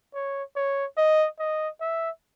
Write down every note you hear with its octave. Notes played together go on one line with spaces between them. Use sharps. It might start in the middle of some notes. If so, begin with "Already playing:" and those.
C#5
C#5
D#5
D#5
E5